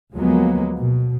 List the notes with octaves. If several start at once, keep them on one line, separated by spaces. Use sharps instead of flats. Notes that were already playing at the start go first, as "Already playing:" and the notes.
D2 F3 F#3 G#3 A#3 B3
B2